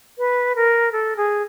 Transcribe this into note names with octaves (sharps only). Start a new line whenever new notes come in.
B4
A#4
A4
G#4